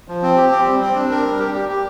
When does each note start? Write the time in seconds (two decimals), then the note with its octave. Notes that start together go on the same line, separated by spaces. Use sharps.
0.08 F3
0.22 C4
0.37 G4
0.51 C4
0.66 G3
0.81 C4
0.95 D4
1.11 A#4
1.25 G3
1.39 G4
1.54 G4
1.69 G4